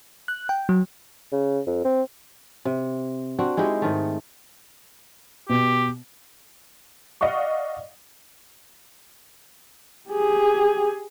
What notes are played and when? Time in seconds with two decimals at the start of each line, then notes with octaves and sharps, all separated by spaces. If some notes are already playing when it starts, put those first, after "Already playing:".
0.28 F#6
0.49 G5
0.69 F#3
1.32 C#3
1.67 F2
1.85 C4
2.65 C3
3.39 C4 D4 F#4
3.57 G#3 D#4 E4 G4
3.82 G#2 D#3 A3
5.49 B2 G4
7.21 D5 D#5 F5 F#5 C#6
10.09 G4 G#4